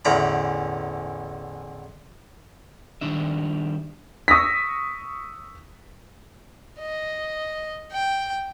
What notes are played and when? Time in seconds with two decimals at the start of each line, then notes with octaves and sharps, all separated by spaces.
0.05 A1 E2 D3 A#5 B5
3.01 D#3 G3 D4 E5
4.28 C#6 D#6 E6 A#6 B6
6.80 D#5
7.92 G5